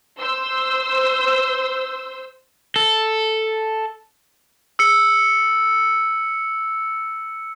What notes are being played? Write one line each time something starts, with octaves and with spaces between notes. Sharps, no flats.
C5 E6
A4
E6 C#7